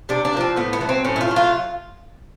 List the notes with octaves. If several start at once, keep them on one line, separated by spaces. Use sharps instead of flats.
C3 D4
D4
A#3
F3 C4
A2 B3
B3
F#3 A3
C4
A2 C#4
E4
F4
F#3 A3
F4